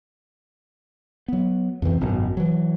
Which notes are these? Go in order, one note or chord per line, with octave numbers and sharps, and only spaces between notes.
F#3 B3
F2 C3 E3 C4
G#1 F#2 B2
E3 F#3